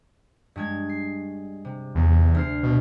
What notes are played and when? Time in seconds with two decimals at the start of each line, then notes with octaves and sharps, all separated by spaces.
0.56 G2 G#3 G#6
0.89 C7
1.65 C3
1.95 E2
2.35 D2 F6 C7
2.63 B2